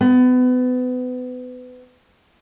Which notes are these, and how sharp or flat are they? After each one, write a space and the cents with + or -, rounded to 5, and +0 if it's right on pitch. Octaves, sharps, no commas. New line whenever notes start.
B3 +30